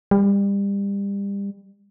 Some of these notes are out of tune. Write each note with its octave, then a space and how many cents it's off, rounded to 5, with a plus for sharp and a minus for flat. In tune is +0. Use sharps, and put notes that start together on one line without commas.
G3 +30